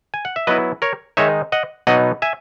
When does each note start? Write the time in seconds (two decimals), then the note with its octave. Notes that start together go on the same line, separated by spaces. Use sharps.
0.14 G#5
0.25 F#5
0.36 E5
0.47 F#3 B3 E4 B4 D#5
0.82 A#4 C#5
1.17 D#3 G#3 D#4 C#5 E5
1.52 D#5 F#5
1.87 B2 F#3 B3 D#4 D#5 F#5
2.22 E5 G#5